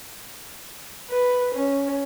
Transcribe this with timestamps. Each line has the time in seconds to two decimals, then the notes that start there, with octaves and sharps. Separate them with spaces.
1.10 B4
1.55 C#4